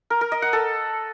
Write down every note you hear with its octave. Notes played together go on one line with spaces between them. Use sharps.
A#4
A#4
D#5
F#5
A4